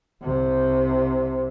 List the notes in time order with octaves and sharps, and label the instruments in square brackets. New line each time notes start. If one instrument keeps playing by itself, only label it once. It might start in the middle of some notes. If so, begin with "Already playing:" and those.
[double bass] C2 C3